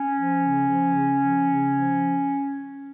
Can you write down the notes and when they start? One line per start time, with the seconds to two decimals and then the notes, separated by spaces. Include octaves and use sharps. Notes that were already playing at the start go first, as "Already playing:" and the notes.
Already playing: C#4
0.15 F3
0.40 C#3
0.67 F3
0.93 C#3
1.19 F3
1.45 C#3
1.70 F3